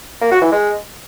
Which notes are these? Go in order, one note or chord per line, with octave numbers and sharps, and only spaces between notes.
A#3
F#4
E3
G#3